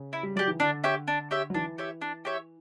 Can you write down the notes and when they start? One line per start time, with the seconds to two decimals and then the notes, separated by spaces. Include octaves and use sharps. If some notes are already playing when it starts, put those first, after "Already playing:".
Already playing: C#3
0.13 E4
0.23 G3
0.36 F#3 G4 D5
0.48 E3
0.60 D3 D4
0.84 G4 C#5 E5
1.08 D4
1.31 G4 C#5 E5
1.50 F#3
1.54 E3 D4
1.78 G4 C#5 E5
2.02 D4
2.25 G4 C#5 E5